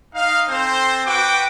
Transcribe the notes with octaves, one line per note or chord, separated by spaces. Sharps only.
D#4 F5
C4 A4 C5
F#4 B4 F#5 G5 D6